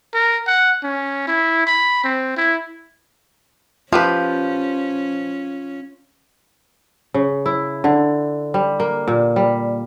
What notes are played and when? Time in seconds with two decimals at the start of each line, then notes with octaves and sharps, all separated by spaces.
0.14 A#4
0.47 F#5
0.83 C#4
1.28 E4
1.67 B5
2.04 C4
2.37 E4
3.92 F3 C#4 F4 G4 B4
7.14 C#3
7.46 E4
7.84 D3
8.54 G3
8.80 A#3
9.08 A#2
9.36 G3